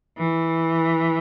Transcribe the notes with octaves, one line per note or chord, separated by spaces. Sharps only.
E3